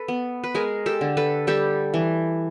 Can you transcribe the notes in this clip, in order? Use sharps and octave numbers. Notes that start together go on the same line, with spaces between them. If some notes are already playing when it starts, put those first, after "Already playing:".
Already playing: A4 B4
B3
B4
G#3 G#4 A#4
G4 A4
D3
A4 B4
G3 G4 A4
E3